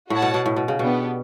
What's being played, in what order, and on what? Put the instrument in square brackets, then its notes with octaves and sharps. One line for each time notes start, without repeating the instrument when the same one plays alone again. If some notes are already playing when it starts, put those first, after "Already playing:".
[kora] A2 [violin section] F#4 C#5 F#5 A5
[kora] B2
B2
A2
B2
C#3
[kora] B2 [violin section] B3 D4 G4